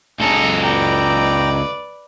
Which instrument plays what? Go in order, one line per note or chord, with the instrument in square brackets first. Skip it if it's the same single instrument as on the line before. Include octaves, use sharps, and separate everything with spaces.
[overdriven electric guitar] C#2 A4 [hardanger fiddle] G#4 A#5
[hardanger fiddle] B4 D5 [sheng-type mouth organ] G5 A#5